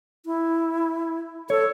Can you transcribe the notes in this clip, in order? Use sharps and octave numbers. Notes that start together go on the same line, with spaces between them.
E4
A4 C#5